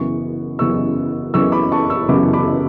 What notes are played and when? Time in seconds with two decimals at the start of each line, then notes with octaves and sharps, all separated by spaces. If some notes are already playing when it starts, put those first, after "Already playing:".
Already playing: F#1 F#2 C#3 E3 B3 C#6
0.59 F#1 F#2 C#3 E3 B3 C#6 E6
1.34 F#1 F#2 C#3 E3 B3 C#6 E6
1.52 B5 D6
1.72 A5 C#6
1.90 C#6 E6
2.08 F#1 F#2 C#3 E3 B3 B5 D6
2.33 B5 D6